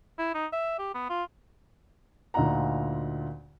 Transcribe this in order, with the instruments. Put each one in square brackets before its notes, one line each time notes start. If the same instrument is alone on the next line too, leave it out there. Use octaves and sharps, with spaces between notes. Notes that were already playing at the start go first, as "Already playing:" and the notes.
[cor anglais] E4
D#4
E5
G4
B3
F4
[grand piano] D2 A#2 D#4 F4 F#5 A#5